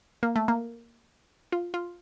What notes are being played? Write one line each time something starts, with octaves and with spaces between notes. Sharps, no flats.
A#3
A3
A#3
F4
F4